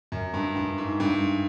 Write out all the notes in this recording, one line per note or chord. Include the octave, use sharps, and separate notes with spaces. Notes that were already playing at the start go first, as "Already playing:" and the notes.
F#2
G2
G2
G#2
G2